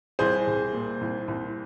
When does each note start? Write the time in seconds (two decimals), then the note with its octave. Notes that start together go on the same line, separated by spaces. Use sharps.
0.19 C2 G#4 C5
0.47 C2
0.73 A#2
1.01 C2
1.28 C2